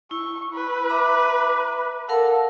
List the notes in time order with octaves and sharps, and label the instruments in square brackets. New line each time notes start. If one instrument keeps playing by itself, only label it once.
[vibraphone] E4 [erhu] C#6
[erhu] B4
[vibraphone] E5 A#5 D6
[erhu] A4 [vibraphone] A#4 F5 F#5